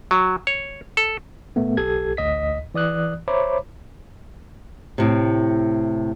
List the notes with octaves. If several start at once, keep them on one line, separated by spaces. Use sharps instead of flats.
F#3
C#5
A4
A#2 A3 B3
B1 G4 A4 G#6
A1 D2 D#5 B6
E3 D5 D#6 F#6
C5 C#5 E5 A#5 B5 D6
A2 C3